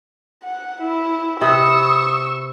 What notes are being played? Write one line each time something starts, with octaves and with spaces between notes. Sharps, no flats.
F#5
E4
C3 E4 B4 C#6 D#6 E6